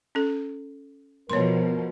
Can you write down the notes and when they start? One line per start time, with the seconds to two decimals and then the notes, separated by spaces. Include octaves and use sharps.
0.15 C#4 A4
1.30 B2 F3 A#4 C#5 C6